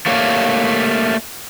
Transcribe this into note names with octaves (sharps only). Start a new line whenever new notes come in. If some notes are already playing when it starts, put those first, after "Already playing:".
A3 A#3 G4 C#5 D5 F5